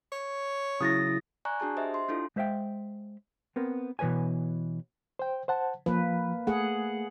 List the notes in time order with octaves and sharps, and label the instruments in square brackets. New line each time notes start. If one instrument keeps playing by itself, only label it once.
[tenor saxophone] C#5
[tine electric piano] C#3 F#3 [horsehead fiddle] E4 [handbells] D#6 A6 A#6
[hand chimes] D5 G#5 A#5 C#6 F#6
D4 F#4 G#4 A5
G4 C5 D#5 E5
C6
D4 E4 F4 A4
[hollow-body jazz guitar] G#3 C5 E5 F5 G5
B3 C4 A#4
B2 E3 B4 C#5 G#5
[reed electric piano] C5 G5
C5 F#5 A5
[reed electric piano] F3 [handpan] A#3 B4
[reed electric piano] A3 [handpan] G#4 F#5